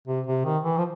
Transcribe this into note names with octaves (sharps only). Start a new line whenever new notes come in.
C3
C3
D#3
E3
F3